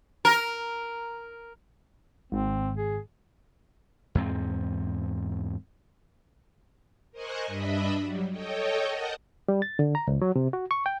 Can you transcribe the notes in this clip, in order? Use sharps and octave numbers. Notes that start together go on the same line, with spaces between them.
A#4
G#1 C4
G#4
E2 G#2 C4
A#4 C5 D#5 G#5 C#6 F#6
G2 D4 D#5 E5 B5
F#3 G3
A4 C#5 D#5 G5
A#4 D#5 F#5 A5 A#5 G6
G3
A6
D3
A#5
C#2
F#3
C3
F#4
C#6
G5